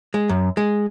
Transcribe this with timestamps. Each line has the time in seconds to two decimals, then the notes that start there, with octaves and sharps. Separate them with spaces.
0.14 G#3
0.29 F#2
0.57 G#3